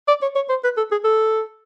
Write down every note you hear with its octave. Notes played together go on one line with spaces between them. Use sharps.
D5
C#5
C#5
C5
B4
A4
G#4
A4